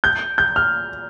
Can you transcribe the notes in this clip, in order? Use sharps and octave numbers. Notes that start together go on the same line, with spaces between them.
G6
G6
F6